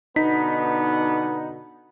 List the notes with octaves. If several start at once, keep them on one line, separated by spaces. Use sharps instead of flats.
B2 D3 B3 D#4 B6